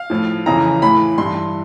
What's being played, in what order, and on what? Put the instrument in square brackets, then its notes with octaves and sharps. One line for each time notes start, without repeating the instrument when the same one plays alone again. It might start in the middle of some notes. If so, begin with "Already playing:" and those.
Already playing: [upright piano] F5
A2 F3
F2 C#3 E3 A#5
A2 E3 B5
G2 E3 C6